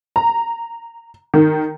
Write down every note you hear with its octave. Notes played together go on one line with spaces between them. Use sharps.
A#5
D#3